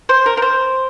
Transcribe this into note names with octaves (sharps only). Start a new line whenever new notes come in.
C5
A#4
A#4
C5